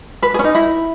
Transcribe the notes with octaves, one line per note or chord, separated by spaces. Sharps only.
B4
G#4
C#4
D#4
E4